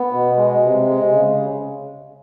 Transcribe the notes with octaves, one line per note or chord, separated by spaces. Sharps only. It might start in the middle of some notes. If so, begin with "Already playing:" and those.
Already playing: B3
B2
G#3
C3
G#3
C#3